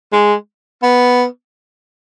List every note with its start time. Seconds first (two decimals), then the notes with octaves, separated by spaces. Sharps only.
0.13 G#3
0.82 B3